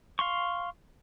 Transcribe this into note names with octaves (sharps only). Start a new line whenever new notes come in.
F5 C6 C#6